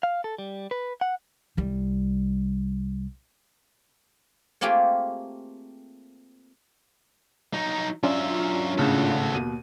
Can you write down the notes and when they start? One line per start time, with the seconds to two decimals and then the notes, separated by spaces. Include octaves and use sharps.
0.03 F5
0.24 A4
0.38 G3
0.71 B4
1.01 F#5
1.57 C2 G3
4.61 A3 A#3 C4 F4 G4 G#4
7.53 F#3 D#4
8.04 F#3 C#4 D4 F4 E5
8.78 G#1 A2 C#3 F#4 A4
9.32 D#2 B2 D#7